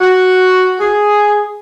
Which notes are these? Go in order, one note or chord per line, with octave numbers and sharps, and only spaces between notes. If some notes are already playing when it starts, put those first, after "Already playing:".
F#4
G#4